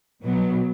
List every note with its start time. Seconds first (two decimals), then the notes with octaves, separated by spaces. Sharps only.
0.22 B2 F#3 B3